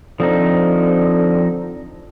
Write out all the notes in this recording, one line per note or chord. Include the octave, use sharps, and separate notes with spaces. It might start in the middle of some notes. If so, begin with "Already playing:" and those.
D3 F3 C4 D#4